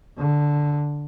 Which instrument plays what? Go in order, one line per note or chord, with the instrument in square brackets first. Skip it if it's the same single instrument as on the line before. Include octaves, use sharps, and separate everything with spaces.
[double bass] D3